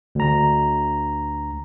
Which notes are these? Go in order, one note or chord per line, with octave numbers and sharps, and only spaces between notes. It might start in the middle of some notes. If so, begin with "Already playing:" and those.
D2 A#5